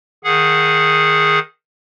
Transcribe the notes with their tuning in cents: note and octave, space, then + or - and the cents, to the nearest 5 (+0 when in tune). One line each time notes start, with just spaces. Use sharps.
D#3 +0 G#4 +0 F#5 -20